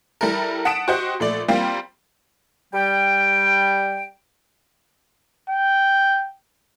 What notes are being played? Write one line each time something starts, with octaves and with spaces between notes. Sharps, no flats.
G3 E4 A4 A#4
F#5 A5 D#6 B6 D7 E7
F#4 G4 C5 D#5 F#5
A#1 A3 D5
G3 A#3 C4 F4
G3 G5
G5